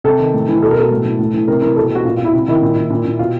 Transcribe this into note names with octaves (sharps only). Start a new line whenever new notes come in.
C3 A4
D#3
A2
E3
B2 A4
A#4
B2 A4
A2
E3
A2
E3
C3 A#4
E3 A#4
B2 A4
B2 F#4
A#2 F4
A#2 F4
E4
C3
D#3 E4
A#2
A#2
A#2
A#2
B2 F4